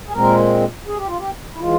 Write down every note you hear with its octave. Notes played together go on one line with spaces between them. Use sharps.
G#4
A#2 G#3 C4 A#4
G#4
G4
F4
G4
E4
E3 G#3 F4